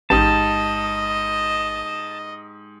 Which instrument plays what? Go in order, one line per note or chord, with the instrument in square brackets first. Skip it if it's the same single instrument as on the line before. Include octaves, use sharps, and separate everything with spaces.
[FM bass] A1 [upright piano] G#2 G4 [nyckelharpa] D#5 [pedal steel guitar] A5